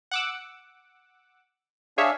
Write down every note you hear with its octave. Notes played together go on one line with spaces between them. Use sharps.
F#5 D6 E6
D4 G#4 C#5 E5 F5